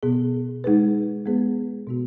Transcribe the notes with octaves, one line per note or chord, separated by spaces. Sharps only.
B2 B3 G#4
G#3 D#4 G#4 B4
G#3 B3 G#4 B4
B2 B3 F#4